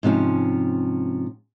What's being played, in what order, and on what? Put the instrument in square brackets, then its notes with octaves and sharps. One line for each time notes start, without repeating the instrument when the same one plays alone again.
[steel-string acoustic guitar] G#2 C3 F3 C#4